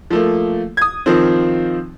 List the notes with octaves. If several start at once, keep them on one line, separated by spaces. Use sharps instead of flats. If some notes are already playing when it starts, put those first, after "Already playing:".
F3 A3 A#3
D#6 G#6
D#3 F3 C4